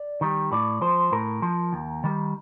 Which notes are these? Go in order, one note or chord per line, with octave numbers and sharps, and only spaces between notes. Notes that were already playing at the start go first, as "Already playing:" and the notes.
Already playing: D5
D#3 G3
A2 D5
F3 C5
A2 A#4
F3
D#2
D#3 G3